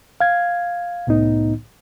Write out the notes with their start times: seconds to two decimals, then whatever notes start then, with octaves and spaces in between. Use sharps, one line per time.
0.20 F5 G#6
1.07 C2 A2 B3 D#4